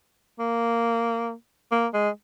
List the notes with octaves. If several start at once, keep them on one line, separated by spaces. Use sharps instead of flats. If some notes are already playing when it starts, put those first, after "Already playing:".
A#3
A#3
G#3